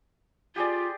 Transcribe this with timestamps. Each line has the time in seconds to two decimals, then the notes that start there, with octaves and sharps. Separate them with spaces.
0.56 F4 G4 G#4 D5